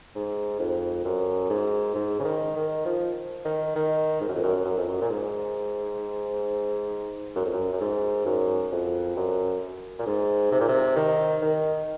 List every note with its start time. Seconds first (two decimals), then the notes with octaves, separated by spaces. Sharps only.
0.16 G#2
0.60 F2
1.05 F#2
1.50 G#2
1.95 G#2
2.20 C#3
2.25 D#3
2.56 D#3
2.86 F3
3.45 D#3
3.76 D#3
4.21 G#2
4.28 F#2
4.35 F2
4.44 F#2
4.65 F#2
4.78 F2
4.88 F#2
5.02 A#2
5.10 G#2
7.36 F#2
7.46 F2
7.53 F#2
7.73 F#2
7.81 G#2
8.26 F#2
8.72 F2
9.17 F#2
9.99 A#2
10.07 G#2
10.52 C3
10.61 A#2
10.69 C3
10.96 D#3
11.42 D#3